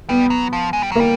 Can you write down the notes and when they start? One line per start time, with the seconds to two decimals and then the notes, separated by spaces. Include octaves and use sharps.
0.09 G3 B3
0.30 F#3
0.53 F3
0.73 G#3
0.83 G3
0.92 F#3
0.96 G3 A#3